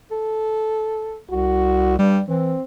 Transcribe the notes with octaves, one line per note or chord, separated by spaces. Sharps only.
A4
C2 F#4
G2 G3
E3 C4